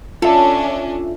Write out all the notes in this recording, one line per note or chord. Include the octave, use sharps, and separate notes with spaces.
C#4 D4 F4 A4 E5